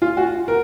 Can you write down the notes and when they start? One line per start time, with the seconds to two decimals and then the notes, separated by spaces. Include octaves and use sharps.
0.02 F4
0.17 F#4
0.48 A#4